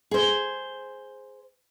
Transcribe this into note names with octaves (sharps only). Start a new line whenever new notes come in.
G#4 C5